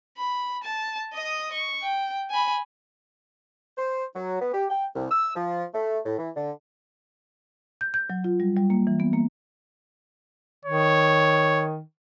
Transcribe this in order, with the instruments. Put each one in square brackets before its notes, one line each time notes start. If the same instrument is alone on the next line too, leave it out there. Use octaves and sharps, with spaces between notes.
[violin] B5
A5
D#5 D#6
C#6
G5
G#5 B5
[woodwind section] C5
F#3
B3
G4
G5
C2
E6
F3
A3
A2
E3
D3
[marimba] G6
G6
F#3
F4
G3
G3
A#3
E3
B3
A#3
[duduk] D#3 [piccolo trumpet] C#5